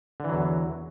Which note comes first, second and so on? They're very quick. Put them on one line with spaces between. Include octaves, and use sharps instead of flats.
D3 E3 F#3 E2